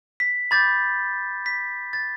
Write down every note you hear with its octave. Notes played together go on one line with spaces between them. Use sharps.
B6
B5 D6 G6 A6
B6
A6